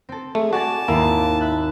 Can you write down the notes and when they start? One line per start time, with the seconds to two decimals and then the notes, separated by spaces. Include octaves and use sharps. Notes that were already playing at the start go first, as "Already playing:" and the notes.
0.09 C4 A4
0.35 A3 G#4
0.53 F#4 D5 G#5 A5 A6
0.88 G#1 D#2 A#3 E4
1.41 E5 F#6